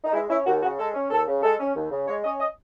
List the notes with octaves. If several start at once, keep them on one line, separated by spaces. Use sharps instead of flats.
D#4
G#3 E4
C#4 E4
D#2 F#4
C#3 F#4
G#3 A4
C#4
D#2 A4
C#3
G#3 A4
C#4
D#2
C#3
G#3 C#5
C#4 D#5
D#5